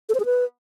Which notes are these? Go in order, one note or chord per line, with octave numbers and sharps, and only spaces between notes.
A4
C5
G#4
B4